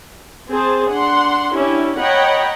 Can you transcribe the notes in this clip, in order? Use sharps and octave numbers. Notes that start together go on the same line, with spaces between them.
C4 G#4 C5 A5
D4 F#5 C6
C#4 D4 E4 G4
C#5 D#5 F#5 G5 A#5 B5